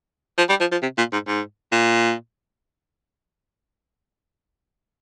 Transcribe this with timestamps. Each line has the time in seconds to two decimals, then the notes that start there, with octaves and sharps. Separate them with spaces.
0.38 F3
0.49 G3
0.61 F3
0.72 F3
0.82 C3
0.98 A#2
1.13 G#2
1.27 G#2
1.72 A#2